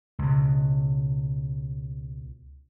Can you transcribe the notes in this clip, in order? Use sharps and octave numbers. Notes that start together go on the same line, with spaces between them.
C#2 B2